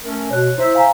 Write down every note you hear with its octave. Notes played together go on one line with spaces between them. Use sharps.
A3 C#4 A#4
B2 C#5 F#6
E4 C5 E5
F5 G#5 A#5